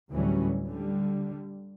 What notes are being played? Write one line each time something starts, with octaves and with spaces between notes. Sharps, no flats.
D2 A2 E3 F#3 G3 C#4
D3 G3